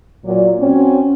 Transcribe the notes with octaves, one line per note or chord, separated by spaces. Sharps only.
A#2 F#3 D5
C4 C#4 F#4